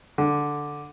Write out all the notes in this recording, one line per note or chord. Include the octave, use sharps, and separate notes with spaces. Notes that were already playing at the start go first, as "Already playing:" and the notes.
D3